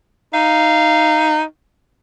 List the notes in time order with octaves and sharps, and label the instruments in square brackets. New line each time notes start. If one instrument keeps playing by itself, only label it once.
[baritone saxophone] D#4 [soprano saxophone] F5